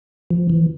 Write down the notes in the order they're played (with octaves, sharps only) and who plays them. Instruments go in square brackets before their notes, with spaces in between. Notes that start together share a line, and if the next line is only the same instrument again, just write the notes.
[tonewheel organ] F3
E3